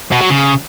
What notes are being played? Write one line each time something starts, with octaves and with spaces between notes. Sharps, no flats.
B2
F#3
C#3